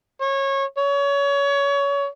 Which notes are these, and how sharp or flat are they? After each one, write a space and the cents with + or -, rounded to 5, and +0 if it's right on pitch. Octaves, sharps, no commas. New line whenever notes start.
C#5 -20
C#5 +25